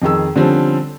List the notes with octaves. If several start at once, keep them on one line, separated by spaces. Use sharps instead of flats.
F2 D#3 G#4 E6
D3 F3 G3 C4 C#4